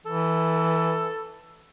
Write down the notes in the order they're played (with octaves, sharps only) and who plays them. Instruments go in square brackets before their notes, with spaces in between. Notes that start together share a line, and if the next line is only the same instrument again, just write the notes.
[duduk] E3 [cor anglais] A4